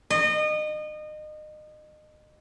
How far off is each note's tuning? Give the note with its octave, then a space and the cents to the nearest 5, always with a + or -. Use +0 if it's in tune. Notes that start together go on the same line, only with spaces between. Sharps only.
D#5 -30